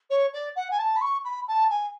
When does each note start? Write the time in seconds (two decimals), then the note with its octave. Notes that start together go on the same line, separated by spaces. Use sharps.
0.10 C#5
0.33 D5
0.56 F#5
0.70 G#5
0.78 A5
0.95 B5
1.01 C#6
1.24 B5
1.48 A5
1.70 G#5